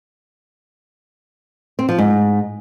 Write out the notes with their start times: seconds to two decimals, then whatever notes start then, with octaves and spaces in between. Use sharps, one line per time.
1.79 C4
1.89 F3
1.98 G#2